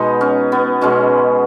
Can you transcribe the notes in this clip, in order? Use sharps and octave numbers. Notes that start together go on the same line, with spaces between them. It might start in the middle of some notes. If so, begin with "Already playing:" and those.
Already playing: B2 G#3 B3 D#4
C#4
B3
B2 G#3 C#4